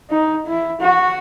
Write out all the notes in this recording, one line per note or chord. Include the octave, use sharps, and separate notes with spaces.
D#4
E4
F#4